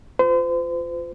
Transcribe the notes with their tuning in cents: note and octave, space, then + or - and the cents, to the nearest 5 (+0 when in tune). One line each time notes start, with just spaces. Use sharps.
F4 +0 C5 -40